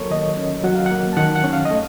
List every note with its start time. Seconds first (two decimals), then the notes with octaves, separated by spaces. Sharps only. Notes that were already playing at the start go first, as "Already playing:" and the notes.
Already playing: F#3 A#3 A4 A#4 C#5
0.11 D#3 D#5
0.37 C#4
0.64 F#3 F#5
0.75 F5
0.86 F#5
0.91 A#3
1.13 A5
1.17 D#3 F#5
1.36 F#5
1.44 C#4
1.53 F5
1.65 D#5
1.71 A3